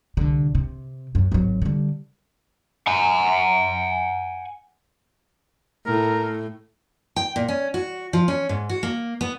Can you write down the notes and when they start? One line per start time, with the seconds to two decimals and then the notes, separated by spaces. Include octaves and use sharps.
0.17 C2 D3
0.55 C3
1.15 F#2
1.32 G#1 F#3
1.62 D3 G3
2.87 F#5 G#5
5.86 A2 A#4
7.16 G5
7.36 A#2
7.48 C#4
7.74 F#4
8.13 F3
8.28 C#4
8.49 G#2
8.70 F#4
8.83 A#3
9.21 B3